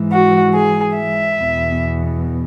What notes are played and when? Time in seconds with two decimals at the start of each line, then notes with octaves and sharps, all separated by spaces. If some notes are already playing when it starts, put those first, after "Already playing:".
Already playing: G#2 E3
0.12 F#4
0.54 G#4
0.97 E5
1.39 E2 B2